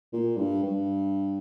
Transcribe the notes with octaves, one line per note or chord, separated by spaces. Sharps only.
A#2
G2
G2